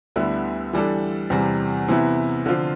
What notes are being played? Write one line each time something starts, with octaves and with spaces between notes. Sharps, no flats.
D2 D3 G3 B3 E4
E3 G3 D4 A4
E2 C3 G3
C3 E3 B3 E4
D3 F3 C4 F4